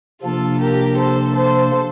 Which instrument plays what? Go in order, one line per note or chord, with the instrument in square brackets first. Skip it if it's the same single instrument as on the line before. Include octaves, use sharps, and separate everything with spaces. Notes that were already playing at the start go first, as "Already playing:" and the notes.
[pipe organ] C3 F3 A#3 D4 [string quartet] F4 A4
[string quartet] G4 A#4
A4 C5
A4 C5